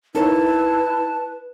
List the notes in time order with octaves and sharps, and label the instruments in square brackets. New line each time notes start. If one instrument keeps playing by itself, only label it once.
[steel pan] D#4 A#4 C#5 [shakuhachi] E4 [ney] B4 [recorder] A5